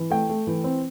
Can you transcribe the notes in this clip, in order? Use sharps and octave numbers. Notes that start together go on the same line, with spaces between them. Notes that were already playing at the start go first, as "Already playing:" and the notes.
Already playing: E3
A3 G5
A3
E3
C4